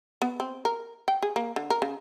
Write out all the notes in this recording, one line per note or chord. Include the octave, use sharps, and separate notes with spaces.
B3
C4
A#4
G5
G#4
A#3
D3
A#4
C#3